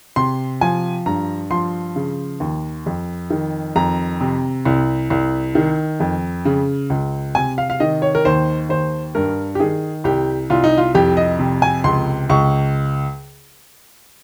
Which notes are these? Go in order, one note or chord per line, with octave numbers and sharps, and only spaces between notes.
C3 C6
F3 G#5
G2 A#5
F3 C6
C#3
D#2
F2
D#3
F2 A#5
C3
C2
C2
D#3
F2
C#3
C#2
C3 G#5
F5
F5
D#3 D#5
C#5
A#4
D#2 C5
D#2 C5
G2 A#4
G4
D#3 G#4
C2 G4
C2 F4
D#4
F4
F2 G4
D#5
C3
G#5
C#2 C6
C#2 C#6